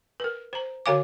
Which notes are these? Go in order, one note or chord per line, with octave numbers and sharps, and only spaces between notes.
A#4 B4
C5 A#5
D3 F#4 C#5 F5 G#5 D6